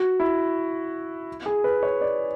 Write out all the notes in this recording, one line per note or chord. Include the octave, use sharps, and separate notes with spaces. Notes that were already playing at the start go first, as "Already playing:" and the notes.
Already playing: F#4
E4
G#4
B4
C#5
D5